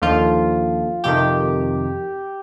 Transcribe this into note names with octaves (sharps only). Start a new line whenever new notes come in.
D#2 D3 F3 F4
F2 C3 D#3 G4